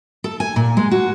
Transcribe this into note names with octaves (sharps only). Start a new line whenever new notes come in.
A4
G#5
A#2
G#3
F#4